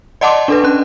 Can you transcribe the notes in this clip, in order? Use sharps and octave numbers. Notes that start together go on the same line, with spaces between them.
D5 D#5 F#5 A5 C6 D6
D4 A4 B4
C#4 F#6